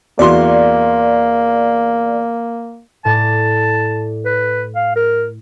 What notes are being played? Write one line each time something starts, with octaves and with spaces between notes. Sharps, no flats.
E2 A#3 F#4 D5 C6
A2 D5 A5
B4
F5
A#4